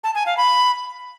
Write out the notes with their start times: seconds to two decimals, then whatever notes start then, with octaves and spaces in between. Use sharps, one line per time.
0.04 A5
0.15 G#5
0.26 F5
0.37 B5